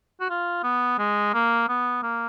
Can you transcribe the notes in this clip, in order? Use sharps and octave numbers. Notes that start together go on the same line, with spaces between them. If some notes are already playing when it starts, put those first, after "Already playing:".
F#4
F4
B3
G#3
A#3
B3
A#3